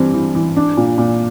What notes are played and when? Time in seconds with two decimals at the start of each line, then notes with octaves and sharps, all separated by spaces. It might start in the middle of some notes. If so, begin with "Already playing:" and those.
Already playing: G2 E3 C4
0.14 E3
0.35 E3
0.56 D4
0.77 A#2
0.98 A#2